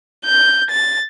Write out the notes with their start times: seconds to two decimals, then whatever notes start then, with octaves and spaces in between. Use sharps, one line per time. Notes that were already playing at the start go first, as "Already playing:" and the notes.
0.25 G6
0.71 A6